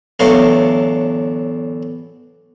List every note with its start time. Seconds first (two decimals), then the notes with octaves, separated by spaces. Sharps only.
0.20 E2 A2 D3 F#3 A4 F5